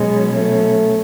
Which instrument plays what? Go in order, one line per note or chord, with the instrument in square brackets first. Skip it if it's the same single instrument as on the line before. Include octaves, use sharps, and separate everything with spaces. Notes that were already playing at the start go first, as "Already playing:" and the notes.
Already playing: [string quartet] B2 F#3 C#4 [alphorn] G#3
[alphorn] A3